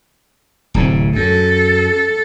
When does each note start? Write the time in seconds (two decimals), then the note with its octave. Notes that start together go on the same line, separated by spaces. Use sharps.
0.74 D1 A2 C3
1.16 F#2 A4